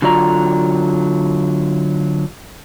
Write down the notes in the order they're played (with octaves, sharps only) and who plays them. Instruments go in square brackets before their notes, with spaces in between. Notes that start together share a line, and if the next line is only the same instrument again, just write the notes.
[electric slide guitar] D3 F#3 F4 D5 A#5